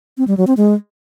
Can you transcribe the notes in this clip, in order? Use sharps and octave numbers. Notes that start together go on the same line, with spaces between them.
C4
G3
F#3
C4
G#3